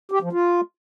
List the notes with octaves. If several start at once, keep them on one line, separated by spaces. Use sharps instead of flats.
G4
F3
F4